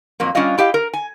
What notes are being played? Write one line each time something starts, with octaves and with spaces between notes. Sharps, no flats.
F2 F#3 A#3
G3 C#4 D4 F4 D#5 F5
E4 G4 D#5 F5
A#4
G#5